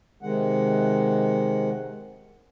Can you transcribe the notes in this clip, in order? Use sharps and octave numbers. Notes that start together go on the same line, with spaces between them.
C3 D#3 G#3 F#5